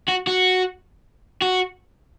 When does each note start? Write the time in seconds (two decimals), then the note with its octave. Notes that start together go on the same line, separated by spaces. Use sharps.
0.09 F#4
0.28 F#4
1.42 F#4